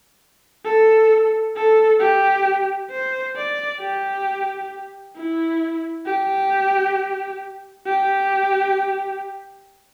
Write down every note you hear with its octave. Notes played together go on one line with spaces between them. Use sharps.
A4
A4
G4
C5
D5
G4
E4
G4
G4